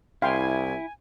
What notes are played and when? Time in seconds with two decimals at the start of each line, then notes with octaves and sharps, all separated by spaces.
0.22 C2 E4 F5 G5 G#5 C6